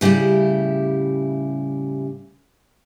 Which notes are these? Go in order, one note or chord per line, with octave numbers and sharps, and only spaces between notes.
A2 C#3 G3 E4 G4